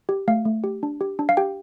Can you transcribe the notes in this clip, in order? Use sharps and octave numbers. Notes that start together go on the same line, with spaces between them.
G4
A3 F5
A3
G4
D4
G4
D4
F5
G4 G5